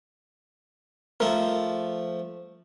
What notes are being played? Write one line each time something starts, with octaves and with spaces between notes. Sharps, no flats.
F3 A3 A#4